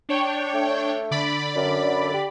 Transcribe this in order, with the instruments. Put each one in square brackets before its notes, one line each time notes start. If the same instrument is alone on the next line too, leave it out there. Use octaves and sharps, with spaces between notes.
[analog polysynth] D4 C#5 G5
[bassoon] A3
[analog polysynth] D3 D5 B5
[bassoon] F#2
G4